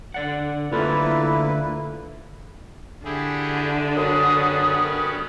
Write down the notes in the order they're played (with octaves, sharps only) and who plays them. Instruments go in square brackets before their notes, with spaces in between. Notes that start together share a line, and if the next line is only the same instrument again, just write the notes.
[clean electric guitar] D3 D5 F#5
[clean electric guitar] D2 F4 A4 [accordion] A#3 E4 B4
[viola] D3 [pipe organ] E4 G4 G#4
[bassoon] F#2 [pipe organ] G3 B3 C#4 [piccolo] D#6